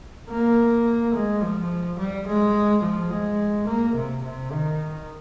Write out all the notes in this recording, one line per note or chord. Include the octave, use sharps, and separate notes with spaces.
A#3
G#3
F3
G3
G#3
F3
G#3
A#3
C3
C3
D#3